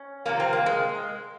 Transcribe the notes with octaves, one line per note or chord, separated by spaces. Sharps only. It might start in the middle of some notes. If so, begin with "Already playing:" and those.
Already playing: C#4
C3 F3 A#3
C4
A#3
G#3